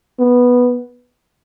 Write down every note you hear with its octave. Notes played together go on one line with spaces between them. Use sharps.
B3